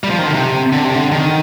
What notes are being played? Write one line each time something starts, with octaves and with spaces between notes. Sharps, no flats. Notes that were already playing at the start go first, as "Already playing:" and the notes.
G3
F3
D#3
D3
C3
D3
C3
D3
D#3